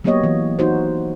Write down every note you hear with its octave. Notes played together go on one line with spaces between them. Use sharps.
F#3 A#3 B3 G4 C#5 D#5
E3
D#4 F#4 C5